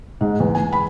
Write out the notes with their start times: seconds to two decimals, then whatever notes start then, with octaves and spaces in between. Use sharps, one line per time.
0.21 G#2
0.40 E2
0.55 G#5
0.73 B5